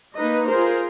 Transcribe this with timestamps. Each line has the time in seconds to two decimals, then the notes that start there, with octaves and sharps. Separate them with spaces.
0.17 A#3 D#4 B4 D#5
0.49 F4 G#4 A#4 C5